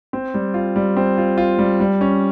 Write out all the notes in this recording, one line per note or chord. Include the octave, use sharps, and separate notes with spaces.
C4
G3
F4
G3
C4
F4
F4
G3
G3
C#4